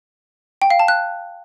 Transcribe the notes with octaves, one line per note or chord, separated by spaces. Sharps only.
G5
F5
A5
F#6